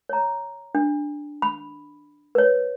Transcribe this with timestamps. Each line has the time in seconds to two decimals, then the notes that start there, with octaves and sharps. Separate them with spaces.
0.09 C#5 A#5
0.75 D4
1.42 B5
2.35 B4 C#5